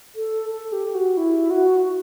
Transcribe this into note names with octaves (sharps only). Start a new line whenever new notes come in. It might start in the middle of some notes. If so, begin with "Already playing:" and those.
A4
A4
G4
F#4
E4
F#4